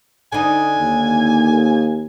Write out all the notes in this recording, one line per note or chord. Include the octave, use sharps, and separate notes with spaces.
D3 D#4 G#5
D#2